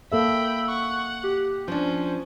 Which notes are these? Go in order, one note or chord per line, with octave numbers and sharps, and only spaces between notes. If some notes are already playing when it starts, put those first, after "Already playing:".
A#3 A4 E5 G5 B5 E6
F#5 C#6
G4
F3 C#4 D4 C5